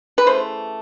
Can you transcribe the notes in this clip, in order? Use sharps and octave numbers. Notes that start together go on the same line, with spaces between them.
B4
C#3 E3 A3 C5